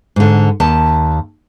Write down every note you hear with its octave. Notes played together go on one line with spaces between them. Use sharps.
G#2 D3
D#2 A5